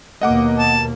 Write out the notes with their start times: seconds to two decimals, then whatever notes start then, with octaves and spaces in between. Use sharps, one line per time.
0.22 D#2 B2 A#3 D#5 F#5 D6
0.59 A5